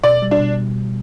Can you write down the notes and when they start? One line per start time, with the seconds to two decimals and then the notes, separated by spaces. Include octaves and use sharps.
0.04 B2 D5
0.22 G3
0.31 D4
0.40 B2